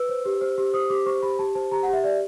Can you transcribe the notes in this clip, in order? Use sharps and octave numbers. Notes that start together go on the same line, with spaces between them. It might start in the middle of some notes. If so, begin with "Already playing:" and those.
Already playing: B4 E6
C5
G4
C5
G4
C5 D#6
G4 D6
C5 C#6
G4 B5
G4 A5
C5 A5
G4 A#5
G4 F#5
E5
D5 E5